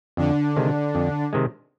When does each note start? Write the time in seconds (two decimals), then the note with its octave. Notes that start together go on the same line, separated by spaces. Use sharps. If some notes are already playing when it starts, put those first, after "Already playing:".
0.17 F2 D3 D4
0.56 C3 D#3 G#3
0.95 F2
1.33 C3 D#3 G#3